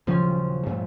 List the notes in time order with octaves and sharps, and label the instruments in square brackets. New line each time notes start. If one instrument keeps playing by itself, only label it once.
[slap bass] D#1 C#3 F#3 [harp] F3 C#4
[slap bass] G2 A#2 A3